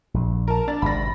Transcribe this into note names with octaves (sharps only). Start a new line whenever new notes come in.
A#1
A#4 A5
D4 A6
G#1 C3 B5 A#6